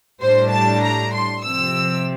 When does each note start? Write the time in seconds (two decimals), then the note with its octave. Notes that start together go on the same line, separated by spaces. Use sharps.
0.23 A2 G3 D4 C5
0.53 A5
0.83 A#5
1.14 C6
1.44 C3 F3 C4 E6